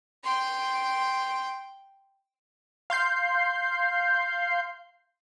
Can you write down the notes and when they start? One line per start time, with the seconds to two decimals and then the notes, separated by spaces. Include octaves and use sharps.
0.24 G5 C6
2.90 F5 C6 G6 C7